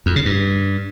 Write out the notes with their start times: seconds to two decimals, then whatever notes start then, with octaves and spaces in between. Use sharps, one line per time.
0.06 F2
0.16 C#3
0.25 G2